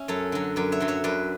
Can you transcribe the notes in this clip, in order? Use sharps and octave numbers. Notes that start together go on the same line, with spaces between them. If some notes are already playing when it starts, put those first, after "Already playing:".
Already playing: C#4 E5
F#2 A4 C#5
D3 F#3
F#2 B4 D5
C#5 E5
D3 F#3
C#5 E5
F#2 B4 D5